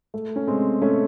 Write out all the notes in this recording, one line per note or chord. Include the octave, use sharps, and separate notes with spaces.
A3
C#4
G#3 C4
A3 C#4